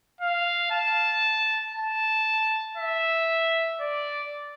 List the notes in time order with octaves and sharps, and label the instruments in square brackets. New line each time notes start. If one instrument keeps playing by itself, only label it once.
[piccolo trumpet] F5
A5
A5
E5
D5